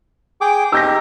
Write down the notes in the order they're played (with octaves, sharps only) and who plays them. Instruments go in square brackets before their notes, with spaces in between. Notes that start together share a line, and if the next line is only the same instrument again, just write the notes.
[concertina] G#4 G5 D6
[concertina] D#4 G4 [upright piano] E6 G6 A#6